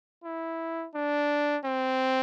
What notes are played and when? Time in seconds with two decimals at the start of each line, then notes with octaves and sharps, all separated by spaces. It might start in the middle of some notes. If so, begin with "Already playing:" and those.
0.24 E4
0.94 D4
1.64 C4